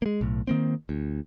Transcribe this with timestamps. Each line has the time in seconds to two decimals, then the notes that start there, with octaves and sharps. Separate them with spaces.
0.02 G#3 A#3
0.21 B1 A2
0.47 D#3 A#3 C4
0.89 D2